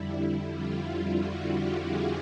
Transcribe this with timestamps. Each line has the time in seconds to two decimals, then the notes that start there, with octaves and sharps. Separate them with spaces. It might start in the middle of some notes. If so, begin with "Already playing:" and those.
Already playing: F2 D3 G3 E4
0.54 F4
0.86 F4
1.20 F#4
1.52 G4
1.85 G#4